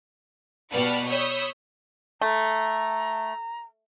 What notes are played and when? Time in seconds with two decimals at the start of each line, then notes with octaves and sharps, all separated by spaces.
0.72 B2 G3 B4 F#5 A5 F6
1.08 C#5 B5 D#6 E6 G6
2.21 A3 A#5